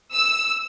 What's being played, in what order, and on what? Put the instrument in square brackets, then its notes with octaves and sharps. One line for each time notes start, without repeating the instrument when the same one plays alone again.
[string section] E6